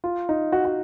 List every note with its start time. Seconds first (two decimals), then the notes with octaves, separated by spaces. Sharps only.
0.04 F4
0.29 D#4
0.52 F#4
0.65 F#4